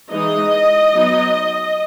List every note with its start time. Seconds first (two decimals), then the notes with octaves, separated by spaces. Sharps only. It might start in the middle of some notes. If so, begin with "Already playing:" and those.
0.11 E3 G#3 D#4 D#5
0.92 F#3 B3 D#4